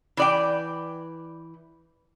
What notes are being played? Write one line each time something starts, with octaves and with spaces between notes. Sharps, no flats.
E3 D5 G5